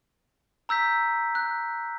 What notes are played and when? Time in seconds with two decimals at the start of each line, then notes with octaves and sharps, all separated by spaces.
0.69 A#5 E6 G6 B6
1.35 F#6